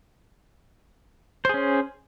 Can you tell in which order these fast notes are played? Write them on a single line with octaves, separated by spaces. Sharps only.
C5 G#4 C#4